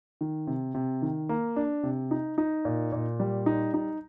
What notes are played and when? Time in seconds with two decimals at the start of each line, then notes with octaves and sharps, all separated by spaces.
0.21 D#3
0.47 C3
0.75 C3
1.02 D#3
1.29 A#3
1.56 D4
1.83 C3
2.11 D#4
2.38 D#4
2.65 A#2
2.92 A#2
3.20 G3
3.46 D#4
3.74 D#4